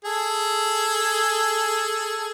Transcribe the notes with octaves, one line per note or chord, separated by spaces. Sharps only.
G#4 A4